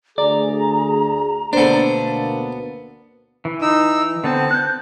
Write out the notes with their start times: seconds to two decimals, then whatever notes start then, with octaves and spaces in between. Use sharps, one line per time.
0.18 D2 G#4 D5 A#5
1.53 D2 B2 A#3 B3 D4 A4 C5
3.45 E3
3.62 D#4 E6
4.24 D3 B3 C4 A5
4.51 F#6 G6